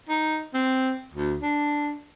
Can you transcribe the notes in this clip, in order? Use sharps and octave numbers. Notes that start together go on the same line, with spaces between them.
D#4
C4
D2
D4